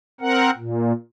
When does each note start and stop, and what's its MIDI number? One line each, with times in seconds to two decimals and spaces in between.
0.21 0.50 60
0.21 0.50 70
0.21 0.50 78
0.58 0.93 46